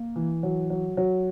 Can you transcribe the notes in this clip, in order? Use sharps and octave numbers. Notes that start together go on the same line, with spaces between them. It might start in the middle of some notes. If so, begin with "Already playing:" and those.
Already playing: A#3
E3
F#3
F#3
F#3